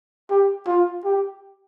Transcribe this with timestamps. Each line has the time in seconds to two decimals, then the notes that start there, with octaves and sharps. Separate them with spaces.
0.30 G4
0.67 F4
1.04 G4